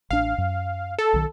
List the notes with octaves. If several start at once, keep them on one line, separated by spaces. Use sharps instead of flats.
A1 D4 F5
F#2
A4
B1 D#3